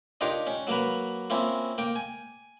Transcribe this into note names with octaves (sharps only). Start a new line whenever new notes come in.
D4 D#4 F4 G4 A#4 C#5
C#4
F#3 A#3 A#4 B4
A#3 C4 C#4 E4 F4
A#3 G5
G#5